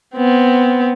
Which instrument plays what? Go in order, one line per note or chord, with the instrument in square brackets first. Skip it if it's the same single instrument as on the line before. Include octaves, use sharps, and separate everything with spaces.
[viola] B3 C4